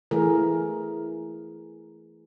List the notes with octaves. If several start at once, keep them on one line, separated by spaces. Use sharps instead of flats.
E3 A3 G#4 A#4